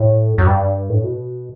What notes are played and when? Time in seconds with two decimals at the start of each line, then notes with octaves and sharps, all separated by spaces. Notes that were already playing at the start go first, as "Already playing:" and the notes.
Already playing: A2
0.38 F#2
0.47 G2
0.89 A2
1.04 B2